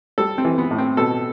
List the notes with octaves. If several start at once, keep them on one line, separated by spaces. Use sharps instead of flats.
G3 A4
C4
E3
B3
A2
C4
B2 A4